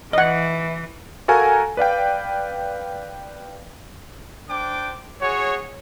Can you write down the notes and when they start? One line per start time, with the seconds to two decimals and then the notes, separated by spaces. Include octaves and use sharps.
0.13 E3 D#5 F#5
1.28 F#4 A4 A#4 F5 G#5 A#5
1.77 B4 D5 F5 G5
4.49 D4 C5 G5 D6
5.21 F#4 G#4 C#5